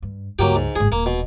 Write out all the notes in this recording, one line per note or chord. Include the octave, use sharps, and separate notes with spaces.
G2
C#2 G2 F#3 A#3 G4
G#2
G#1 D4 G#4
D#1 A#3
B2